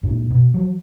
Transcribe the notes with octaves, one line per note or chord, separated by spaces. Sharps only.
F#2 A#2
B2
F3 F#3